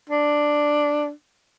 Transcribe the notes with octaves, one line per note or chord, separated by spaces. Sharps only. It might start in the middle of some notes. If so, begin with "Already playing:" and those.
D4